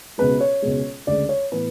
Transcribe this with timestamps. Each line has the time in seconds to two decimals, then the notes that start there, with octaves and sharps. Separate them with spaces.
0.18 C#2 B2 G#3 B4
0.41 C#5
0.62 C#2 B2 G#3
1.07 D2 C#3 G#3 D5
1.29 C#5
1.52 A2 E3 B3 B4